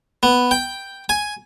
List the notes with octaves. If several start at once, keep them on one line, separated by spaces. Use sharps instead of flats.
B3
G5
G#5